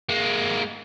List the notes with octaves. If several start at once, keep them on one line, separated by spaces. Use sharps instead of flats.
G#3 A#3